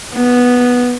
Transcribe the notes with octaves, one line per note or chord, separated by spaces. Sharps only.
B3